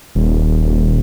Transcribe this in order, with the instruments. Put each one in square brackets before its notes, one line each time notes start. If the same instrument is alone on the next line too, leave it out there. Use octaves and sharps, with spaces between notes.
[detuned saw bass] D#1